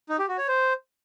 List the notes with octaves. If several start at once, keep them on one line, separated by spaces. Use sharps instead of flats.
D#4
G4
F#4
C#5
C5